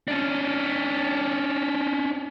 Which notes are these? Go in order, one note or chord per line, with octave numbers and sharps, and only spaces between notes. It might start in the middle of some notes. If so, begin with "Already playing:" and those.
C#4 D4